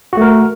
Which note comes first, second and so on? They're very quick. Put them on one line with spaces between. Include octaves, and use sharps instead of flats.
F#4 A3 A#4